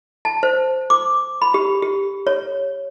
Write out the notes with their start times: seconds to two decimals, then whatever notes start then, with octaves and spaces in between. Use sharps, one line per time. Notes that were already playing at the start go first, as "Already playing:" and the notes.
0.25 A5
0.43 C5
0.90 D6
1.42 B5
1.54 G4
1.83 G4
2.27 C#5